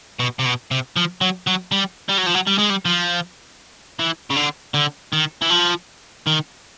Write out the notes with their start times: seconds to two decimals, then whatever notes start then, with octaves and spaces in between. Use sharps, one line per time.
0.19 B2
0.39 C3
0.45 B2
0.71 C3
0.96 F3
1.21 F#3
1.47 F#3
1.72 G3
2.09 G3
2.18 F#3
2.27 F3
2.35 F#3
2.47 G3
2.58 G#3
2.70 G3
2.85 F3
3.99 E3
4.30 C#3
4.36 D3
4.74 D3
5.13 D#3
5.42 E3
5.51 F3
6.27 D#3